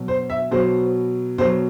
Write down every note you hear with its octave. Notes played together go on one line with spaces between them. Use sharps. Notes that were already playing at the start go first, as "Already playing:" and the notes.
Already playing: B2 F#3
C5
E5
B2 F#3 C5
B2 F#3 C5